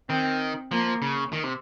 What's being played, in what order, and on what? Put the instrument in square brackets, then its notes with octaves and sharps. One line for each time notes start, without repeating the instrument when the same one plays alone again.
[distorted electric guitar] D#3 [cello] C4
[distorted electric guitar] F3 [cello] A#3
[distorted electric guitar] C#3
D#3
C3